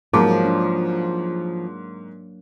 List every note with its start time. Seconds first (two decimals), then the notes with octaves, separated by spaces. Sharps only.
0.13 G#2 F3 F#3 A#3 A#4 D6
0.45 D4